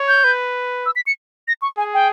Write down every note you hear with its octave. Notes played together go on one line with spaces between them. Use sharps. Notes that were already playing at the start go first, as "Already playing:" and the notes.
Already playing: C#5
G6
B4
E6
B6
C#7
A#6
C#6
G#4 G#5
G5